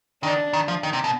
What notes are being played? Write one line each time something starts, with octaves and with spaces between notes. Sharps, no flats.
D#3 D4
D#3
F3
D#3
C3
B2